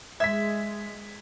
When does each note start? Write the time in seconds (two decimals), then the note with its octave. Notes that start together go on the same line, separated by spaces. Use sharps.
0.20 G#3 E5 G#6 B6